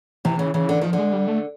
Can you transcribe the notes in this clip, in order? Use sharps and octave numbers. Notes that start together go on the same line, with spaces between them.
C3 E3
C#3
C#3 E3
D3
D#3 F3
D3
G#3
G3
A3